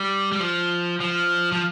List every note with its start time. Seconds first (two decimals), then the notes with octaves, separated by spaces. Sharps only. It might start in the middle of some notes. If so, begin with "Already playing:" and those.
Already playing: G3
0.32 G3
0.40 F3
1.01 F3
1.52 F3